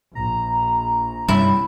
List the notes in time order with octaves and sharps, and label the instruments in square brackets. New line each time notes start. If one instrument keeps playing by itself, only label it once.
[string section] A#1 [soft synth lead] A#5
[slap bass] G2 C3 G3 [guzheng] E4